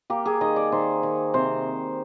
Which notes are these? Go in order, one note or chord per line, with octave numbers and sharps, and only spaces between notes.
A#3 G4
G#4
D#3 D#5
D5
D#3 C5
D#3
C3 C5